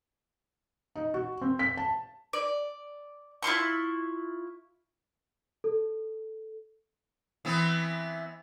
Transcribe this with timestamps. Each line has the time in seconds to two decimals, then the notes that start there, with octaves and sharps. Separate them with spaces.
0.96 D#4
1.14 F#4
1.41 C4
1.59 B6
1.77 A5
2.33 D5
3.43 E4 F4 C6 C#6
5.64 A4
7.45 E3 B3 C4